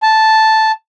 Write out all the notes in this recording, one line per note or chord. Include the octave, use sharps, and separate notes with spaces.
A5